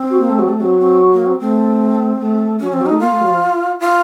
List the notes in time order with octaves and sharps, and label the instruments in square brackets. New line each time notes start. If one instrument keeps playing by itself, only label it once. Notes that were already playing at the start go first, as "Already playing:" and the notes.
Already playing: [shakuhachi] C4
[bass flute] F#4
A#3
A3
F#3
A3
[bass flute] F#3 [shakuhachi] C4
[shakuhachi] C4
A#3
C4
[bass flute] A3 [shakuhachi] C4
[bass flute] A3
[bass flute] F#3 [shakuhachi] C#4
[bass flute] F3 [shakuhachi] C4
[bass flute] F#3
[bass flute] A3 [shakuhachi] D#4
[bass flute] A#3 [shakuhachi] F4
[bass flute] A3
F#3
F3
[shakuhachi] F4